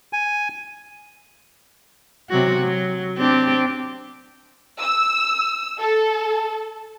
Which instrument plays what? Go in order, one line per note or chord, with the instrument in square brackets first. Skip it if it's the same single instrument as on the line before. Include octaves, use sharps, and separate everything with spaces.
[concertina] G#5
[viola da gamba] C3 F#3 F#4
F#3
C4 D4 G4
[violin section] E6
A4